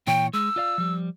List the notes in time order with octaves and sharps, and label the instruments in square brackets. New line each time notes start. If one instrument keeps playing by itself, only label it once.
[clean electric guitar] A#2 E3 C#5 [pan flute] G5
[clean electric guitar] G#3 [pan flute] E6
[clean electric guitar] F4 D5 F5
F3 G3